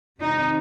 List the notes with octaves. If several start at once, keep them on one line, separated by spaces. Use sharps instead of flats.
C3 D#3 D#4